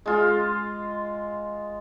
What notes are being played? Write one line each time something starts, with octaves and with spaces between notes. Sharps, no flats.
G#3 F4